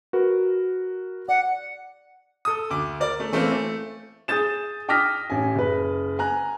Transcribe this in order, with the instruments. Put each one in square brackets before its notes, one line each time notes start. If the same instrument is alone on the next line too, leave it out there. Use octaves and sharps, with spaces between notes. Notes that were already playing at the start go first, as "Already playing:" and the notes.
[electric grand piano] F#4 A#4 B4
[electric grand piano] D5 [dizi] F#5
[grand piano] A4 D#6
D2 D6
A#4 D5
A3
E3 A3 A#3 C4
A3
[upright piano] G#4 D#6 G6 A6 E7
G5 D6 D#6 F6 A#6 B6
A1 G#5
F#1 B4
G#5 A#5 F#6